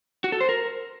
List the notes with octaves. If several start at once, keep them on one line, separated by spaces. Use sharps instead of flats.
F#4
A4
C5
A#4